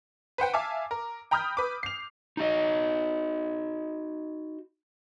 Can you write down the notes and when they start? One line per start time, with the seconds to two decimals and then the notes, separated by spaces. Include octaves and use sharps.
0.38 B4 C5 F#5 G5
0.54 E5 F5 G#5 A5 D6
0.91 A#4
1.31 G5 A#5 B5 D#6 F6 G6
1.57 B4 D6
1.83 C7 F7
2.37 D#4 F#4 D#5